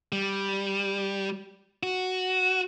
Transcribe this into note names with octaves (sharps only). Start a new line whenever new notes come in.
G3
F#4